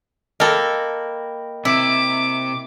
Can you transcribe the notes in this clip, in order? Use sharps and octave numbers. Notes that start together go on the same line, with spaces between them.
A#3 A4 D#5 G5 B5
C3 E4 D6